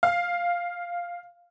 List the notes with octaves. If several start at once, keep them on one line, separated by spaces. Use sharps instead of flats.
F5